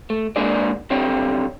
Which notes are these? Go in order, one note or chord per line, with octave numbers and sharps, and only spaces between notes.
A3
G#3 A#3 D4 G#4 D5
B1 D3 G3 C4 C#5 G5